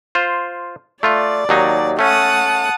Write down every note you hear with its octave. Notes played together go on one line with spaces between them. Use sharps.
F4 C5
A3 F4 D5
D#2 F#3 D#4
A3 C#4 F#5 A5 D#6